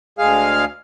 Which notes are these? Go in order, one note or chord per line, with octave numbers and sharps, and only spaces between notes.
D2 G#3 G#4 F5 F6